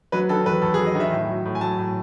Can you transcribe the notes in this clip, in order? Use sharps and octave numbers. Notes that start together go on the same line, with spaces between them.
F#3 B4
D#3 A4
E2 B4
E2 A4
G#4
F#3
D#5
D#3
E5
A2
F#3
A2
G#5
F#3 A5
A2